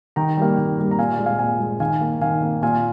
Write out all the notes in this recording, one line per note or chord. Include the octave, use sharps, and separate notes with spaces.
D#3 G5 A#5
G3 A#3
D#3
G3 A#3
A#5
A#2 F5 G#5
D5 F5
G#3
F5 G#5
A#2 F5 G#5
G#3
D#3 F5 G#5
A#3
D#3 F5 G#5
A#3
A#2 F5 G#5